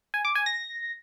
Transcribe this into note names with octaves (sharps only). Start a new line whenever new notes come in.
G#5
D6
G#5
A#6